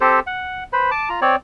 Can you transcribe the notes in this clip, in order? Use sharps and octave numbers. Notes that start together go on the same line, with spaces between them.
C4 G4 A4 C5
F#5
B4 C5 B5
A5 D6
F4 A#5
C4 C#5 D5